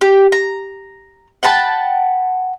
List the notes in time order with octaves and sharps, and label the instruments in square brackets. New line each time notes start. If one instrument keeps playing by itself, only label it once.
[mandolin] G4
A#5
F#5 G5 A5 B5